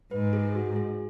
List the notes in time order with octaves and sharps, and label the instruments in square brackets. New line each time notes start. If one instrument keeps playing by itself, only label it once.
[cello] G#2 [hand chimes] B4
[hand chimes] G#4
F#4
G#4